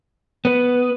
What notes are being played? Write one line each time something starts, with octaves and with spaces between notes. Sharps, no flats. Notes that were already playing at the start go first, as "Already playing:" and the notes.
B3